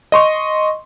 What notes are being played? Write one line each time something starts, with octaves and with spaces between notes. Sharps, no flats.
D#5 C6 C#6